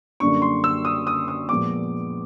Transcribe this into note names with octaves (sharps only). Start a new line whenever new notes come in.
F#2 D3 G3 A#3 D4 C#6
C6
E6
D#6
D#6
D#6
A#2 F3 G#3 B3 D6